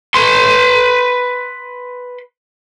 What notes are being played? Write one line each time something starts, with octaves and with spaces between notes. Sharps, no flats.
B4 C6